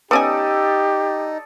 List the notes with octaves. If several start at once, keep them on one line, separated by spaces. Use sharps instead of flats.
B3 C#4 D#4 G4 A4 D5 G#5 D#6